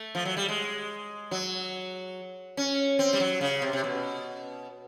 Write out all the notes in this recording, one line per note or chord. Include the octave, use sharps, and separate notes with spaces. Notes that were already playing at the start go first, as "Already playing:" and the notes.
Already playing: A3
F3
F#3
G3
G#3
F#3
C#4
C4
G3
F#3
C#3
C3
C3
B2